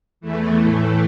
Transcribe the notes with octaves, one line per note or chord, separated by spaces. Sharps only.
E2 E3 A3
A2 E3 A3